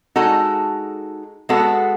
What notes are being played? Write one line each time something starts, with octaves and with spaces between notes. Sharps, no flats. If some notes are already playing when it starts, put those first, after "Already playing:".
G#3 D#4 F#4 A4
G#3 B3 F#4 A4